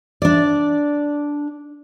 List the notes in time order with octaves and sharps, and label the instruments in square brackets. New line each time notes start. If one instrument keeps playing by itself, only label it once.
[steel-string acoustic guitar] D4 D5